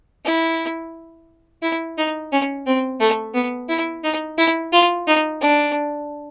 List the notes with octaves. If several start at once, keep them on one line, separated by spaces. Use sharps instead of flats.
E4
E4
D#4
C#4
C4
A3
B3
E4
D#4
E4
F4
D#4
D4